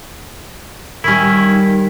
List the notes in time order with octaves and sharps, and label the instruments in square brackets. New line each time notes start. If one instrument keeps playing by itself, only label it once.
[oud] D#3 G3 [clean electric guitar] C#4 E4